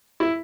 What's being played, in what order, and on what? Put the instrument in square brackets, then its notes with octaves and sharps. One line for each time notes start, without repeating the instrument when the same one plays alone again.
[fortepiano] E4